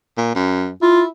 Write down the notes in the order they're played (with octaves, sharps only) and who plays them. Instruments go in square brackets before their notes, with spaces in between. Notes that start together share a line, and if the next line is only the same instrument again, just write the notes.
[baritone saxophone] A#2
F#2
[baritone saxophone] E4 [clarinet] F4